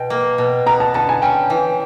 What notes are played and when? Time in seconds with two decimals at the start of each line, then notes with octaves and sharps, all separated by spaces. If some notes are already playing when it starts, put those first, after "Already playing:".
Already playing: B2 G5
0.10 A#3
0.38 B2
0.66 B3 A#5
0.80 A5
0.94 D3 A5
1.09 G#5
1.22 C#4 G5
1.50 E3